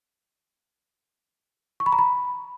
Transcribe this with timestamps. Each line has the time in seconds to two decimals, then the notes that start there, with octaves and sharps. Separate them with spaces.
1.80 C#6
1.86 B5
1.92 A#5
1.99 B5